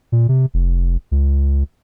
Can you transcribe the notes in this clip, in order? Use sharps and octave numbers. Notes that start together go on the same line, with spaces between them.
A#2
C3
F1
C#2